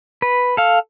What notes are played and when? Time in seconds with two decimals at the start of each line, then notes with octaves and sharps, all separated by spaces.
0.22 B4
0.57 A4 F5